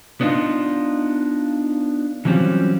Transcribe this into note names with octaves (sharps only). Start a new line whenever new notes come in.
B3 D4 D#4 F4
E3 F#3 G3 C4 C#4 F4